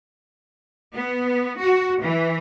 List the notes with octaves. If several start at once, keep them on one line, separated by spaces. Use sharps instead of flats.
B3
F#4
E3